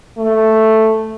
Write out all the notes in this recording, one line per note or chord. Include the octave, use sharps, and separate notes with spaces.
A3